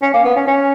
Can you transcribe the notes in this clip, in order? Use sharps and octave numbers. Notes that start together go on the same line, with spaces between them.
C#4
A#3
B3
C#4
C#4